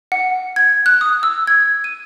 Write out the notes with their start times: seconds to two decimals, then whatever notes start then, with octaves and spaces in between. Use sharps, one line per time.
0.12 F#5
0.56 G#6
0.86 F#6
1.01 D#6
1.23 E6
1.47 G#6
1.84 D#7